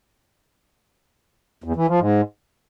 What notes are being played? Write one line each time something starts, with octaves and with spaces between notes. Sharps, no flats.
E2
E3
F3
G#2